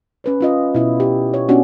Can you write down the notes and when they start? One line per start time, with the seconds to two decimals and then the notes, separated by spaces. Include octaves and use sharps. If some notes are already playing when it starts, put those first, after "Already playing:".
0.24 C#4 B4 C#5
0.41 C#4 F4 D#5
0.75 B2 E4
1.00 G4
1.34 C#5
1.49 B3 C#4 D4 F#4